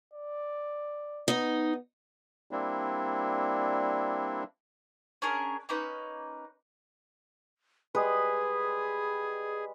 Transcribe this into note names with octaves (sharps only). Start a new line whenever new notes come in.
D5
B3 D#4 D#5
G3 A#3 C4 D4 E4
C#4 D4 G#4 A#4
A#3 C#4 D#4 B4
G3 G#3 G#4 B4 D#6